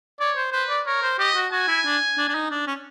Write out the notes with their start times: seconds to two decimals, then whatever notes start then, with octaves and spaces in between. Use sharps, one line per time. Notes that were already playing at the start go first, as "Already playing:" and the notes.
0.20 C#5 D5
0.37 C5
0.53 B4 C5
0.69 D5
0.86 A#4 C#5
1.03 C5
1.19 G4 D#5
1.36 F#4
1.52 F#4 G#5
1.68 E4
1.86 D4
2.18 D4
2.29 D4
2.35 D#4
2.51 D4
2.67 C#4